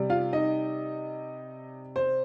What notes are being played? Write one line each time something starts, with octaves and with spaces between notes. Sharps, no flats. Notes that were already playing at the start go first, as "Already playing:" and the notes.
Already playing: C3 G3
F4 F5
D#4 D#5
C5